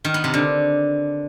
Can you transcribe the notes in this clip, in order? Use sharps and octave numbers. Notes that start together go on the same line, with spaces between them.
D#3
B3
C3
D3